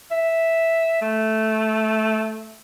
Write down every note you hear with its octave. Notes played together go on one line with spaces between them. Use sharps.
E5
A3